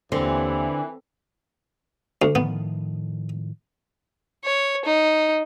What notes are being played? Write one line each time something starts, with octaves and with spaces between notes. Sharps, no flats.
D#2 D3 E3 C4
D2
A2 D#3 F3 B3
C#5
D#4